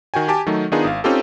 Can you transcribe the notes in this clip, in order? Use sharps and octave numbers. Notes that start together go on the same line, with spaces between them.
D#3 F#4 G5 G#5
G4 G#5 A5 D6
D#3 F#3 A3 D#4
D#3 B3 D4 D#4 F4 G#4
G#1 F5
C4 C#4 D#4 F4 G4 A4